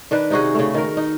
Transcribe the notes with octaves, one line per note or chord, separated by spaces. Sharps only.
D#3 D4 B4
C3 D#4 F#4 G#4
C#3 A3
D#3 A#4
D#4